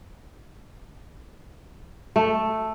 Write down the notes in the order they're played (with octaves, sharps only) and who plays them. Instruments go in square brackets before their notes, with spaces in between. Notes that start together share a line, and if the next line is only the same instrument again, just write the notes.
[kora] A3